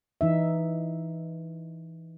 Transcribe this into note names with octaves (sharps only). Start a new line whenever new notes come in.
E3 D#4 E5